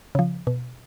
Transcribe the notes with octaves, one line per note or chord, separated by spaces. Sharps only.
C#3 F3
B2